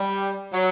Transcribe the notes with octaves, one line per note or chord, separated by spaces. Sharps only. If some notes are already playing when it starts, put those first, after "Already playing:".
Already playing: G3
F#3